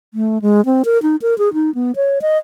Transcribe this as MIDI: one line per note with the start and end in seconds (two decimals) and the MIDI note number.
0.14 0.42 57
0.42 0.64 56
0.65 0.83 60
0.85 1.01 70
1.02 1.16 63
1.22 1.37 70
1.38 1.53 68
1.54 1.73 63
1.75 1.92 59
1.96 2.19 73
2.22 2.38 75